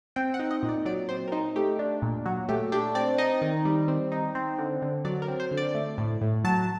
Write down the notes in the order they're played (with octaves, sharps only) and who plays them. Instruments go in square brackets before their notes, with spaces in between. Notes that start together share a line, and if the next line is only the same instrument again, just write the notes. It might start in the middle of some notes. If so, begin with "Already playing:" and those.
[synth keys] C4 G5
F#5
D#4
D#5
A#2
D5
F#3 D5
C4 C5
A#4
D#4 C5
A3 G4
D4
A#2
F#3 F#4
A3 G4
D4 G4
C4 D5
D#4 D#5
D#3
G3
C4
D#4
C4
D3
D3
F#3 D5
A#4
C4
C5
D3
D5
A3
A2
A2
F#3 A5